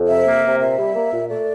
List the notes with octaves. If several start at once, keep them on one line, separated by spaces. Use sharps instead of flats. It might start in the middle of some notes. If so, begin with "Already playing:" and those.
Already playing: F2
C3 E5
A#3
C3
A#2 E5
G3
A#3
A#2
A3 D5